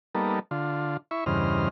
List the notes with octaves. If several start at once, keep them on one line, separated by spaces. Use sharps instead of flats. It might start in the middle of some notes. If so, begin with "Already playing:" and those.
G3 A#3 B3 D#4 A4
D3 F4
E4 E5 C#6
E2 G2 C#3 C5 D#5 F6